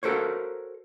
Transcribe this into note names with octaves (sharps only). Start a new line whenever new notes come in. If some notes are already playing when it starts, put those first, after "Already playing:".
F#4 A4 A#4 C5 C#5